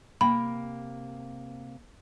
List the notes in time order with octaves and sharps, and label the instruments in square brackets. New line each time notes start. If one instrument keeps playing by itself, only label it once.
[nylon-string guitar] C3 A#3 G5 [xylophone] B5